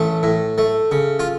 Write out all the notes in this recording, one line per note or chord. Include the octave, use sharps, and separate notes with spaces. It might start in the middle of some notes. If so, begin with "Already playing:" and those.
Already playing: A1 A3 A4
A2
A3
C#3
F4